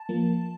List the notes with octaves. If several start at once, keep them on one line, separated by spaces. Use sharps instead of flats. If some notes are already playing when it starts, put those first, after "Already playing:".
Already playing: A5
F3 A#3